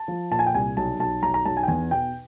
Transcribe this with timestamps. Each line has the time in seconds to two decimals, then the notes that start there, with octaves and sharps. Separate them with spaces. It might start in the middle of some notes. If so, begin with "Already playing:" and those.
Already playing: A5
0.08 F3
0.31 A#2 A5
0.39 G#5
0.46 G5
0.54 C2 G#5
0.77 B1 A5
1.00 B1 A5
1.23 B1 A#5
1.34 A#5
1.45 B1 A5
1.57 G#5
1.63 G5
1.68 E2 G#5
1.91 B2 G5